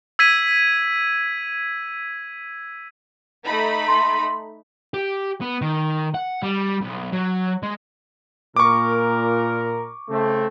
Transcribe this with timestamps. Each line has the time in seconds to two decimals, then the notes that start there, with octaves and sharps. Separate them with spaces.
0.19 E6 G#6 B6 D#7
3.44 A3 D#4 B5
3.88 C6
4.94 G4
5.41 B3
5.62 D#3
6.14 F#5
6.42 G3
6.82 B1
7.13 F#3
7.63 G#3
8.56 A#2 A#4 C#6 D6
10.10 C#3 A3 C4